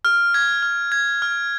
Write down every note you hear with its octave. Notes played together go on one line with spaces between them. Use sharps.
F6
G#6
F6
G#6
F6